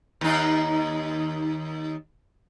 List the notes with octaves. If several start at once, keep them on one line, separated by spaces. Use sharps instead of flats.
D#2 D#4